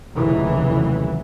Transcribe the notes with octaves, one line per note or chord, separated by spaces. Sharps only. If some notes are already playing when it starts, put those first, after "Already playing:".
F1 D#2 C#3 E3 F#3